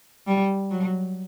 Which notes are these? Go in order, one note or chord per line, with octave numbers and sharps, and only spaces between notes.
G3
F#3